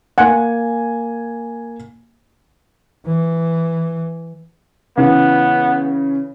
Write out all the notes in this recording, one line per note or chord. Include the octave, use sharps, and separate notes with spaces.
A#3 F#5 G#5
E3
C#3 E3 B3